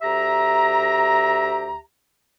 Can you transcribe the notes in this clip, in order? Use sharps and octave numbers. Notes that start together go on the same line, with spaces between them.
D2 G4 E5 A#5